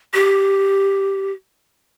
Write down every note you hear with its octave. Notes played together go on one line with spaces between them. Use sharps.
G4